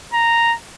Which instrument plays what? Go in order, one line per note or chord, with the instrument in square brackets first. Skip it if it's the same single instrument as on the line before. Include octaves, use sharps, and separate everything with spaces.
[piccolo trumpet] A#5